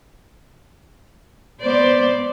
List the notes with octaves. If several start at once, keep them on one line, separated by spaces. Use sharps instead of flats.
B3 C5 D5